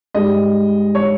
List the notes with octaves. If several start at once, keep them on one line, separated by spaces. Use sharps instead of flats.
G#2 G3 D#5
G3 C#5